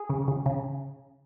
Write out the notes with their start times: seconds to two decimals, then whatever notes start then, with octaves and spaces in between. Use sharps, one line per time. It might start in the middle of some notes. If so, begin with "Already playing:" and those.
Already playing: G#4
0.10 C#3
0.28 C#3
0.46 C#3